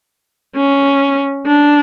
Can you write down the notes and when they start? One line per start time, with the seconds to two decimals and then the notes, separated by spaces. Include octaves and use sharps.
0.55 C#4
1.46 D4